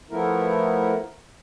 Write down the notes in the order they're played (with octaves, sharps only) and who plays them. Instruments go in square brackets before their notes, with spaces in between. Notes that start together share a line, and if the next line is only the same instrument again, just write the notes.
[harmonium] F3 A3 B3 E4 A#4